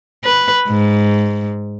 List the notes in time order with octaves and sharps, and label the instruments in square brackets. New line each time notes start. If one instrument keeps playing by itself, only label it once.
[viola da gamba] B4
G#2